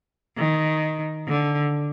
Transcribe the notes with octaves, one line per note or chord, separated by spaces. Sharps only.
D#3
D3